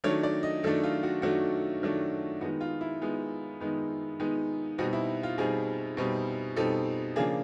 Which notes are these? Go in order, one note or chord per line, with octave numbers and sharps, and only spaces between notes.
D#3 F#3 A3 D4 C#5
D5
D#5
D#3 F#3 A3 D4 A4
F4
F#4
D#3 F#3 A3 D4 F#4
D#3 F#3 A3 D4
D#3 G#3 B3 D#4 F#4
F4
E4
D#3 G#3 B3 D#4
D#3 G#3 B3 D#4
D#3 G#3 B3 D#4
B2 G3 C4 D#4 F#4
E4
F4
B2 G3 C4 D#4 G#4
B2 G3 C4 D#4
B2 G3 C4 D#4 A4
C#3 F3 A#3 D4 G#4